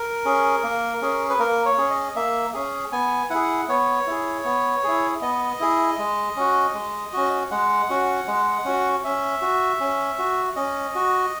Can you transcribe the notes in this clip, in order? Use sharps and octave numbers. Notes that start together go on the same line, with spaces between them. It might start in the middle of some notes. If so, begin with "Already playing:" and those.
Already playing: A#4
C#4 G#4
A#3
C#4 G#4
B4
A#3 A#4
C#5
C#4 G#4
D#5
A#3 E5
C#4 G#4
B3 G#5
E4 G#4 F#5
B3 C#5
E4 G#4
B3
E4 G#4
B3 D#5
E4 G#4
G#3
C#4 F#4
G#3
C#4 F#4
G#3 F#5
C#4 F#4
G#3
C#4 F#4
C#4 E5
F#4
C#4
F#4
C#4 D#5
F#4